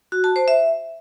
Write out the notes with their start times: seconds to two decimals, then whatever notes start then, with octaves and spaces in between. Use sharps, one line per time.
0.12 F#4
0.24 A5
0.36 C5
0.48 E5